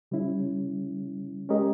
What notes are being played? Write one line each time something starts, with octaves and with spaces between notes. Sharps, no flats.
C#3 G3 C#4 E4
G#3 C#4 G4 A#4 D#5